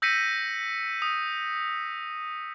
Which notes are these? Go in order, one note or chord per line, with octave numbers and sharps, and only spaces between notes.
E6 G6 A#6 B6 C#7 D#7
D#6